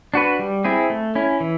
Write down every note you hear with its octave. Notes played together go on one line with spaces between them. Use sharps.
D4 F#4 B4
G3
C4 E4 G#4
A3
C#4 E4
E3